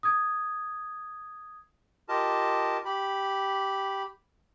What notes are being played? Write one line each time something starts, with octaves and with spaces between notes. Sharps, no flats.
D#6 G#6
F4 G4 A#4 D#5 A5
G4 B5